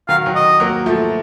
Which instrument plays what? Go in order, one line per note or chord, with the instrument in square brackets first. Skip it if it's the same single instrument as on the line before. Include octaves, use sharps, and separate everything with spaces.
[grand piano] D#3 F#3 [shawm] F5
[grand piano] D#3 F#3
[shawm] D#5
[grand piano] F#3 A#3
F3 A3